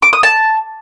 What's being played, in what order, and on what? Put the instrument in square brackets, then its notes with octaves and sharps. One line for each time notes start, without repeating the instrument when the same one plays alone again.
[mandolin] D6
D#6
A5